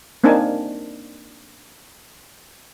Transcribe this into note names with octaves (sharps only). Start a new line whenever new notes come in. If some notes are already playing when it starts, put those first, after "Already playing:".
A#3 C4 D4 D#4 G#5 A5